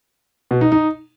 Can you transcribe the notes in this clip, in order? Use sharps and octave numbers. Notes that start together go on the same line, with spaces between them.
B2
D#4
D#4